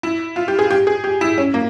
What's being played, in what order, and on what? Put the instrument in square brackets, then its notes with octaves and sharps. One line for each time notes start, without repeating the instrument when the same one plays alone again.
[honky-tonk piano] E4
F4
G4
G#4
G4
G#4
G4
E4
C#4
A#3